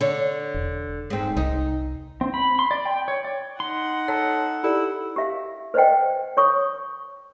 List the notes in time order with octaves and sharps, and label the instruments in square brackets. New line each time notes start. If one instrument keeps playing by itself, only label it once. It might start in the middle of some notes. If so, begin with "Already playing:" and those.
[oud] D3 C#5
[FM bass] E1
[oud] G#2 C4
[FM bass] C2 [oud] D#4
[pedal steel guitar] C4
B5
C6
D5
G5
C#5
D5
[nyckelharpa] D#4 F#5 [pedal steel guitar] C6
[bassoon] A4 [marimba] C#5 A#5
[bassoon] E4 [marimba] G4 A4 D5
[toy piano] G4 E5 F5
B4 C5 D5 D#5 F#5 G5
C#5 C#6 D#6